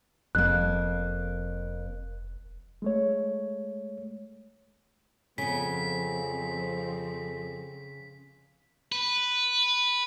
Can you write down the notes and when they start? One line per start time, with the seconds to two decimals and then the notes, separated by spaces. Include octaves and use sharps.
0.35 F1 F2 A#3 F#6
2.82 G#3 A3 C#5
5.38 F2 C#3 F3 B3 C4 B6
8.92 B4